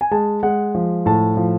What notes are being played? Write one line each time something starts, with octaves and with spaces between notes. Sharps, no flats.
G#5
G#3 A5
G#3 F#5
F3
A2 A5
F3